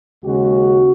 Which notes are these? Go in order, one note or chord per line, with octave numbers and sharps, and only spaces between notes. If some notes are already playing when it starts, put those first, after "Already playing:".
D#2 C#3 G#3 F#4